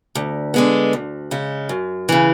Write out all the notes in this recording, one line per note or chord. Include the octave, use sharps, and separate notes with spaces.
D2
D3 G#3 B3
D2
C#3 G#3
F#2
C#3 E3